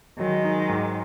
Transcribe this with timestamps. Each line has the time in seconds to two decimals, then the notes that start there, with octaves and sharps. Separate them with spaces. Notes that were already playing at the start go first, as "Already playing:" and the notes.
0.19 D#3 F#3 G#3
0.45 D#4
0.69 G#2